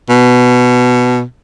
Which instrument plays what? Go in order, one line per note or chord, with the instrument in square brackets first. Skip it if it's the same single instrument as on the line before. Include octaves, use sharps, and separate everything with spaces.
[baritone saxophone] B2